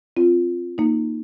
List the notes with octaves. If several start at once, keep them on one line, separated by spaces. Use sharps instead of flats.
C4 F4
A#3 D#4